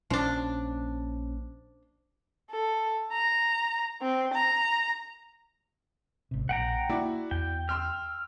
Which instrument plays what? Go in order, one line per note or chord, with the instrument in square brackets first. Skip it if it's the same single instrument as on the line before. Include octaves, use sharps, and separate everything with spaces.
[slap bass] A#1 C#4 [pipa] F3 D4
[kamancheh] A4
A#5
C4
A#5
[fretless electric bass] G#1 C3
[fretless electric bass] A#1 [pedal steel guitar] F#5 G5 A#5
[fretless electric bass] A#3 [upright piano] E4 F#4 D5
[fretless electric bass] E2 [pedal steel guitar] G5
[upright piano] G5 C6 E6 [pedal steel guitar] F6